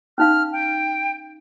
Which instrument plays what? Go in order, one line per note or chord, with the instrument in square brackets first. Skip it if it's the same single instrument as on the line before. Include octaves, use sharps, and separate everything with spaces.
[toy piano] C#4 D#4 F5 [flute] F6
[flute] G5